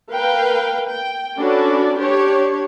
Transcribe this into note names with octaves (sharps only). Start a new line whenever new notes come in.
A#4 B4 F5 G5
G5
C#4 D4 F#4 A4 B4 D5
D4 G4 C#5